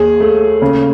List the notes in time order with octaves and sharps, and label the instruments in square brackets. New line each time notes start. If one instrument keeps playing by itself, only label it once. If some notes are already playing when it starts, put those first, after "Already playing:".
Already playing: [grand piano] D#2 G#4
A3
C#3